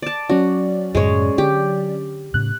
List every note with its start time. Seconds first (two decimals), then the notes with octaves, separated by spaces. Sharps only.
0.02 D5 A5
0.30 F#3 C#4 F#4 D5
0.95 F#2 A2 C#3 G#3 C#5
1.38 D3 G4
2.34 A2 C#3 F#6